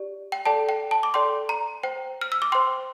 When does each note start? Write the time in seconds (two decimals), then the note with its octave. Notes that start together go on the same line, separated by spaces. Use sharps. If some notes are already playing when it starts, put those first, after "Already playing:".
Already playing: G4 D5
0.32 G5
0.45 A4 D5 G5 A5
0.69 G5
0.91 A5
1.03 D6
1.14 A4 D5 G5 C6
1.49 A#5
1.83 C5 G5
2.21 F6
2.32 E6
2.42 D6
2.52 C5 G5 C6